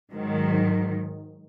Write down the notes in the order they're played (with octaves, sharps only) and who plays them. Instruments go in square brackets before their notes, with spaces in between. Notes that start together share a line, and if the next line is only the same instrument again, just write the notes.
[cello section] G#2 D#3 F#3